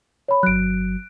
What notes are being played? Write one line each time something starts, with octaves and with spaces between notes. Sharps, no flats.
C#5 B5
G1 F#3 F#6 D7